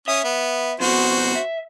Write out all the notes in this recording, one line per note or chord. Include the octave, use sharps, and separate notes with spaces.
C#4 E5 D#6
B3
F2 B2 F#4 C5
E5